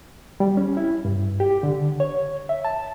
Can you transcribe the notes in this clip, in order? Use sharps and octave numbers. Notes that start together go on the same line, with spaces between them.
G3
C#4
E4
G2
G4
D3
C#5
E5
A5